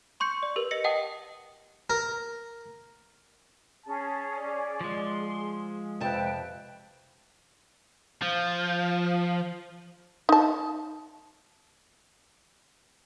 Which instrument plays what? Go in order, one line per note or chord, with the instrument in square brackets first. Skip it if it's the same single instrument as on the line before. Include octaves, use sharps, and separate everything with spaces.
[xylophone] C6 C#6 G6 C#7
D5
G4 A#4 B4
D#5 A#6 C#7 F#7
D#5 F#5 G5 A5 D#6
[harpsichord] A#4
[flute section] C#4 G#4 [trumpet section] A5
[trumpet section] D5
[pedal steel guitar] F3 G#3 [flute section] C6
[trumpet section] G#4
[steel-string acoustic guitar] F2 C3 A5 [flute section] B4 G5
[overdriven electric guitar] F3
[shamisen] D#4 A5